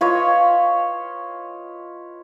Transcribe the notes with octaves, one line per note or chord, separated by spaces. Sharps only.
F4 B4 C#5 D#5